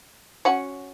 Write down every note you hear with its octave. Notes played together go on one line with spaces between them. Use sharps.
C#4 F#4